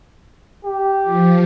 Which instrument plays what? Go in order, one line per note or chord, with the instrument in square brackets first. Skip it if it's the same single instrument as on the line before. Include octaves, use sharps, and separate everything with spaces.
[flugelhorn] G4
[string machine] F3